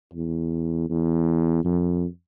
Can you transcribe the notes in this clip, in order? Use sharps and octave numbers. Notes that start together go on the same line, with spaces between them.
E2
E2
F2